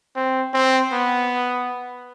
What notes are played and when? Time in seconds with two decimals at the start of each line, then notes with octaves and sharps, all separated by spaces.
0.16 C4
0.54 C4
0.92 B3